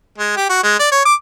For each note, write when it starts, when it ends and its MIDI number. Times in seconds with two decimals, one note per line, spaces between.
0.18 0.32 56
0.37 0.48 67
0.49 0.60 66
0.63 0.75 56
0.80 0.88 74
0.92 1.04 73
1.06 1.14 86